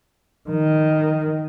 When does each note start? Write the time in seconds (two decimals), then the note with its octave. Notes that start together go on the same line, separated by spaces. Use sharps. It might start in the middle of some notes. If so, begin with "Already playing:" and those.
0.49 D#3